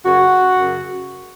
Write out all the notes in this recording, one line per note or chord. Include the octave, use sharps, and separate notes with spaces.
F#2 C#3 F#4
F#2
C#3